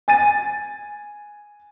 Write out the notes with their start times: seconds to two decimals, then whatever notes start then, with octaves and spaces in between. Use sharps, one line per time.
0.08 G#5 A6 D#7